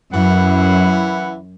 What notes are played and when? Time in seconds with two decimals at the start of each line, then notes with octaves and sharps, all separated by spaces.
0.12 F#2 E3 E4 F#5